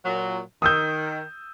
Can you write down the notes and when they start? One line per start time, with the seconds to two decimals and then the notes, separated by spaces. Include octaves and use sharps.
0.04 A#2 F#3
0.62 D#3 D#6 E6 G6